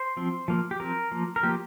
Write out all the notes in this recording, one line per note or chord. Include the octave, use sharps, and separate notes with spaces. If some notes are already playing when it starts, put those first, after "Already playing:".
Already playing: C5
F3 C4
F3 A#3
G4
F3 C4 A#4
F3 A#3
A#4
F3 A#3 G4